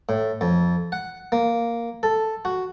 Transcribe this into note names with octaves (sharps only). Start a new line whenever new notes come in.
A2
F2
F#5
A#3
A4
F#4